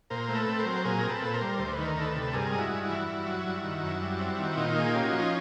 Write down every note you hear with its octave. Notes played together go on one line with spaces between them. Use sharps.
A#2 A#4 C5
A3
A4 B4
C4
A#4 C5
F#3
A#2 G#4 A#4
C4
A4 B4
A#2
A#4 C5
G3
D2 C5
B4
D#3
A#4
D2 A4 B4
C3
G2 G#4 A#4
G#3
E4 F#4
G2
E4 F#4
E3
G2
F#3
G2
D#3
F#2
G3
C4
D#3
A#2 D#4 F4
A#3 G#4
C#4 G4
F#4
F3
F4